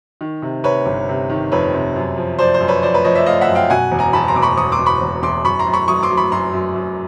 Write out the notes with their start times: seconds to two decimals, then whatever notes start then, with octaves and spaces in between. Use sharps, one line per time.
0.21 D#3
0.42 C3
0.64 C3 B4 C#5
0.86 G1
1.09 C3
1.29 D#3
1.52 F2 B4 C#5
1.74 C3
1.96 F#2
2.18 F3
2.39 F3 C5 D5
2.54 C5
2.60 F#2
2.68 B4 C#5
2.82 F3 C5 D5
2.94 B4 C#5
3.04 F3 C#5 D#5
3.15 D5 E5
3.26 A3 D#5 F5
3.41 E5 F#5
3.48 F#2
3.55 F5 G5
3.70 B2 F#5 G#5
3.91 E1
3.99 G#5 A#5
4.13 E2 A5 B5
4.28 A#5 C6
4.36 B2 D6
4.42 B5 C#6
4.57 E1 C#6 D#6
4.72 C6 D6
4.79 B2
4.86 B5 C#6
5.01 E1
5.22 E2 C6 D6
5.44 F#2 B5 C#6
5.59 A#5 C6
5.66 F#2
5.73 B5 C#6
5.88 F#3 C#6 D#6
6.03 C6 D6
6.10 F#3
6.17 B5 C#6
6.31 F#2 A#5 C6
6.53 F#2
6.76 F#2